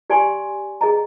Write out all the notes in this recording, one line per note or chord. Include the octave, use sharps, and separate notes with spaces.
G4 D5 G#5 C6
G#4 D#5 A#5